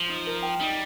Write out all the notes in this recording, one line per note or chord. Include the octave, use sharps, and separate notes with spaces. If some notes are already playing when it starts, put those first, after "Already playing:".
Already playing: F3
D#4
A#4
G5
G3 D#4